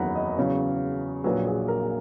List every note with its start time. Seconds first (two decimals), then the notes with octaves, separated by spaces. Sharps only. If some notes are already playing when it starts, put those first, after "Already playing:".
Already playing: F#1 E2 D#3 F#3 F#5 A#5 B5
0.15 D#5
0.37 E2 C#3 F#3 C#5
1.24 A#1 A#2 F#3 B4
1.47 G#4
1.68 A#4